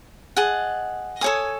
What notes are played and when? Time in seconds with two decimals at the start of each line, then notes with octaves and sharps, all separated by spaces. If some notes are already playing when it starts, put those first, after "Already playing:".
0.36 G#4 D#5 F#5 A5
1.21 A4 C#5 G#5 D#6